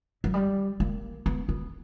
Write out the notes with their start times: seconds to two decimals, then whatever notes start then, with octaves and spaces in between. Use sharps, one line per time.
0.24 F#3
0.34 G3
0.80 A#3
1.26 B3
1.49 B3